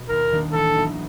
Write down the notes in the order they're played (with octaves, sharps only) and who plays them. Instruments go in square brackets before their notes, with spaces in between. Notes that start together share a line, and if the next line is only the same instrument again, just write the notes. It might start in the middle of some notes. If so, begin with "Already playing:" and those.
Already playing: [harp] B2
[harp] D#2 [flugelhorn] A#4
[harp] D#3 G3 A#3 D4
[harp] A1 [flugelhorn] A4
[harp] A2 F#3 B3 D#4